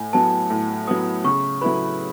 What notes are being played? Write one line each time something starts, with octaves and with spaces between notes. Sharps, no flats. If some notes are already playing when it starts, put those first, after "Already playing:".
Already playing: A2 G#5
F#3 B3 A5
A2
F#3 B3 D#6
C#3 C#6
F#3 A3 E4 B4 B5